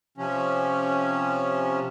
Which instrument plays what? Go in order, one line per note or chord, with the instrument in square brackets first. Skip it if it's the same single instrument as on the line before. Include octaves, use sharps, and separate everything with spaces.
[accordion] C3 F3 C#4